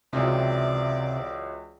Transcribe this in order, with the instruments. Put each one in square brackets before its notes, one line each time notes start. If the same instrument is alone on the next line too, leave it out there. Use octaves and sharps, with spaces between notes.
[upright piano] C#2 E3 F#3 [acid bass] C3 [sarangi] D5